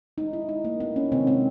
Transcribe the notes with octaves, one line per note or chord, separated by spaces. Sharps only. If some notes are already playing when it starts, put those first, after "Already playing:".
D#3 G#3 D#4
E4
D#4
A#3
B3
C#4
C3 D#3 G#3 C4
C4